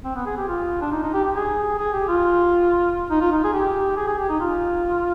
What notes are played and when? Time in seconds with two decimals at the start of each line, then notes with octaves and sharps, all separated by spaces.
0.05 C4
0.15 B3
0.26 G#4
0.37 G4
0.48 F4
0.81 D4
0.91 D#4
1.03 D#4
1.13 G4
1.24 G4
1.35 G#4
1.79 G#4
1.93 G4
2.08 F4
3.10 D#4
3.21 F4
3.32 D#4
3.44 G#4
3.53 G4
3.97 G#4
4.07 G#4
4.18 G4
4.29 D#4
4.40 F4